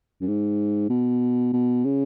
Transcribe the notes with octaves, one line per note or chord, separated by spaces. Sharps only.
F#2
G#2
B2
B2
C#3